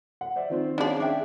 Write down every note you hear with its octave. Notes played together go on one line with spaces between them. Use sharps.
F#5
C5 D5 E5
D#3 C4 F4 C5
C#4 D4 G#4 D5 F5 A5
D4 E5 G5